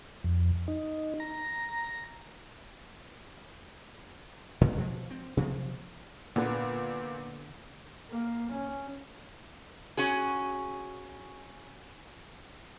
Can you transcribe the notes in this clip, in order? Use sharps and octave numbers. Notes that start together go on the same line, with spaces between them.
F2
D#4
A#5
A2 D3 G#3 B3
B2 F3 G3 G#3
C4
C3 F3 F#3 A#3
A#2 D3 B3 B4
A#3
C#4
C#4 F#4 G#4